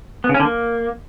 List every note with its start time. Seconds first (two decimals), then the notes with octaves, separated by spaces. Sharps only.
0.24 B3
0.29 C#3
0.34 C#4
0.40 D3
0.45 A#3